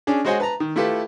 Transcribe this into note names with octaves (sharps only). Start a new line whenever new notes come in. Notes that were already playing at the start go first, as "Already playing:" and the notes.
C#4 D4 G#4
G#3 F#4 C5 C#5 D#5 G#5
B4 A5 A#5
D#3
A3 E4 F4 G4 A4 B4